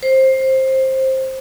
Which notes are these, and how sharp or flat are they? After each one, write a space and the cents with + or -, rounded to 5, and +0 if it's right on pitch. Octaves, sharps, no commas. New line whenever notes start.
C5 +15